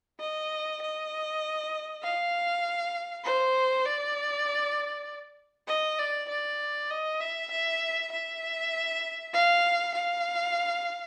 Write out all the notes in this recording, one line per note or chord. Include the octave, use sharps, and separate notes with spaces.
D#5
D#5
F5
C5
D5
D#5
D5
D5
D#5
E5
E5
E5
F5
F5